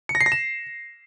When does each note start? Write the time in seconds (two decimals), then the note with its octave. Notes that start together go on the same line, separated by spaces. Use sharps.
0.09 C#7
0.15 A#6
0.21 C7
0.26 A#6
0.32 E7